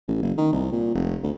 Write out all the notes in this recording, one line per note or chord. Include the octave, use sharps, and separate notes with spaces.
A1
F#1
D#3
C2
A#2
F1
D2